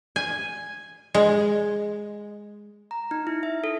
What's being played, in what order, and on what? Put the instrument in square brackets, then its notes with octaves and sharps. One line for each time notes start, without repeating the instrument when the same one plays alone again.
[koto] G#5
G#3
[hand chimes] A#5
D#4
E4
E5
A4